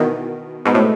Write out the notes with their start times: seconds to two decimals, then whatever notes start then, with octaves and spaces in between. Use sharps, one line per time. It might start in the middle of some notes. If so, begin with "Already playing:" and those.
Already playing: B2 D#3 E3
0.65 G#2 B2
0.74 A2